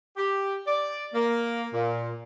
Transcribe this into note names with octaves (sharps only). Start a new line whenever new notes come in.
G4
D5
A#3
A#2